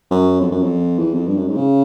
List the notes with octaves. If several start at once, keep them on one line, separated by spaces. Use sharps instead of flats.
F#2
F2
F#2
F2
E2
F2
G2
F#2
G#2
C#3